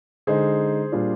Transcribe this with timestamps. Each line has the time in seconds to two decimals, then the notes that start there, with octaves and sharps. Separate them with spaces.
0.27 D3 G#3 D#4 G#4 C5
0.92 A#2 G3 D4 F4